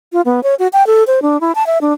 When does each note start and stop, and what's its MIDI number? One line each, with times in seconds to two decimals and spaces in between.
0.13 0.21 65
0.25 0.43 59
0.43 0.55 73
0.59 0.68 66
0.73 0.86 79
0.87 1.04 69
1.07 1.22 72
1.22 1.40 62
1.41 1.52 64
1.55 1.65 81
1.67 1.78 76
1.81 1.93 62